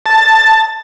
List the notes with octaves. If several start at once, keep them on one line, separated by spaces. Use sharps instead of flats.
A5